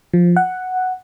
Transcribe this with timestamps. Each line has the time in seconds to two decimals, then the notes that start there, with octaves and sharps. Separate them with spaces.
0.13 F3
0.36 F#5